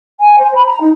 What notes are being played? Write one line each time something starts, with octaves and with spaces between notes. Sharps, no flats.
G#5
C5
B5
A#5
D#4